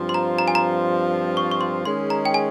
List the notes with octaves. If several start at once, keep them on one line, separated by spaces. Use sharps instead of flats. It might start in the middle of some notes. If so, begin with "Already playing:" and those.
Already playing: G2 F3 C4 F4
C6
A#5
A#5
G#5
A#5
C#6
C#6
C6
D#3 G#3 C#4 G#4 C6
A#5
G5
G#5